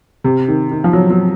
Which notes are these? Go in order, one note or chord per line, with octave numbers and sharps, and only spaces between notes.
C3
D#3
D#3
F3
F#3
F#3